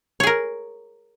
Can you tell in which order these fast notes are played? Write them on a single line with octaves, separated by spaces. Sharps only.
C#5 G#4 A#4